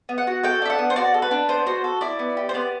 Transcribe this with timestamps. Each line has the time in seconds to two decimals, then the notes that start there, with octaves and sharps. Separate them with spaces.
0.09 B3
0.18 F#5
0.27 F#4
0.43 A4 G5
0.62 D4 E5
0.70 F#5
0.78 B3
0.90 C5
0.96 F#4 D5
1.14 A4
1.22 B4
1.31 D4
1.49 B3 C5
1.66 F#4 C5
1.84 A4
2.01 E4 D5
2.19 B3
2.37 G4
2.49 C5
2.54 B3 D5